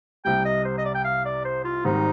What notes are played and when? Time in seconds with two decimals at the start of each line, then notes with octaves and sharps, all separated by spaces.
0.25 C2 C3 G3 G5
0.45 D#5
0.65 C5
0.78 D#5
0.85 D5
0.95 G5
1.04 F5
1.25 D5
1.45 C5
1.65 F4
1.84 G#1 G#2 D#3 G3 C4 D#4